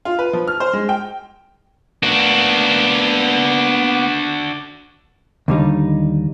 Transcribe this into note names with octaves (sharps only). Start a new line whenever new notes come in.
F4
B4
F3
F6
C5
G#3
G5
A#3 B3 D4 F#4
D#2 D3 G3 D#4